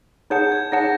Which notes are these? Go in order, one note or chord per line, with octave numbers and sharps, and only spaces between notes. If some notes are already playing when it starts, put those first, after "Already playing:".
D#4 G#4 C#5 F#5 A5 G6
G#6
D#4 G#4 C#5 F#5 A5 A#6